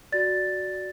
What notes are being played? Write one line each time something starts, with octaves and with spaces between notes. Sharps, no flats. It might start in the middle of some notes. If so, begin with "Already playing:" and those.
F#4 D5 A6